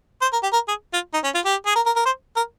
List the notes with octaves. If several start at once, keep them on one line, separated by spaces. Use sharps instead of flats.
C5
A#4
G4
A#4
G#4
F4
D#4
C#4
F4
G4
G#4
A#4
A#4
A#4
C5
A#4